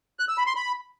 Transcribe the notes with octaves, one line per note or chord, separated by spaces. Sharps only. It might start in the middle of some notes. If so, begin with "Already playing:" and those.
F#6
E6
B5
C6
B5